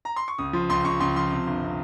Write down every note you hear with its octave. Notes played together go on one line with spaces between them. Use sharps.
A#5
C6
C#6
C#2 D#6
F3 C6
C#2 C6
C#2 C#6
C#2 C6
F3 C6
C3
G1
C3